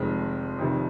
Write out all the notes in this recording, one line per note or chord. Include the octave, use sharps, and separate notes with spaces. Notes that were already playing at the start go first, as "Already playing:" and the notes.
Already playing: F1 F2 D#3 G#3
F1 F2 C3 D#3